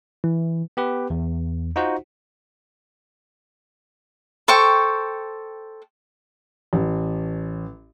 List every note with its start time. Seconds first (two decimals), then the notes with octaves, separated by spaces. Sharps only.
0.24 E3
0.77 B3 G4 B4
1.10 E2
1.76 D#4 F4 F#4 C5 F#5
4.48 A4 C5 G5 C#6
6.73 A1